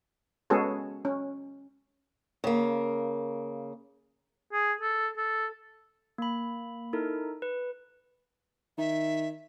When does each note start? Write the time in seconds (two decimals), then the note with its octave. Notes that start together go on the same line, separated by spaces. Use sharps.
0.50 G#3 B3 C#4 F#4 G#4 A4
1.05 C#4
2.44 C#3 A#3
4.53 G#4
4.81 A4
5.17 A4
6.18 A#3 B5
6.93 D#4 E4 A4 A#4
7.42 B4
8.78 D#3 E5